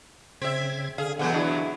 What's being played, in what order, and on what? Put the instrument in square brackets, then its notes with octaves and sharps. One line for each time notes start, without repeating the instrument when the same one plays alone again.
[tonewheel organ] C#3 G#6 [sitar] C4 E5 [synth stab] B6
[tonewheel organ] D3 [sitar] G#4 [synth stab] F5
[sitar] B2 E3 F#3 [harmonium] B3 [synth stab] F#5 G#5 G6
[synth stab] D4 [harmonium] E4 [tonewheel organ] F#4 G#4